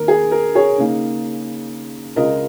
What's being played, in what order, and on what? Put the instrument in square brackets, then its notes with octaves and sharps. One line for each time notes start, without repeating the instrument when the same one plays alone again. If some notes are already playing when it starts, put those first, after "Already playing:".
Already playing: [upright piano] D#2 D#3 A#4
G#4
A#4
G#4 C#5
C#3 A#3 D#4
C#2 C#3 G#3 F4 A#4 D#5